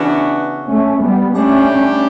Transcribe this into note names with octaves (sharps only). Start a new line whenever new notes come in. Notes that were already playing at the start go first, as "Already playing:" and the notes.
Already playing: C#3 E3 B3 D4 F#4
A3 C#4
G3 B3
G3 A3 C#4 D4 G4